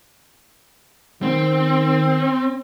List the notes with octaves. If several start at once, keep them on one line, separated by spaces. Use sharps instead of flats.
D#3 C4